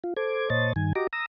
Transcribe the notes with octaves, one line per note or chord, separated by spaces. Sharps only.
F4
A4 C5 D6 G#6
A#2 C5 C#5 D#5 A5 A6
G2 D#3 G#5
F#4 G4 D#5 A#5 D6
A#5 D#6 E6 A#6